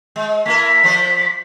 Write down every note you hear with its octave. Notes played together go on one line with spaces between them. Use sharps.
G#3
A3 E4 A#4 B6
F3 C5 D5